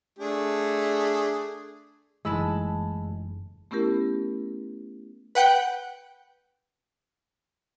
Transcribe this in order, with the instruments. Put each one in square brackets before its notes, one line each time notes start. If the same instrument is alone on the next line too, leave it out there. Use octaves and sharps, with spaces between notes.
[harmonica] A3 D4 G#4
[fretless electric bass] F#1 [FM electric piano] E3 A3 D#4 [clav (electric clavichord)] G#3 [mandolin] A5 B5 E6
[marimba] A3 B3 C#4 E4 G4 A#4
[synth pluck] B4 F#5 G5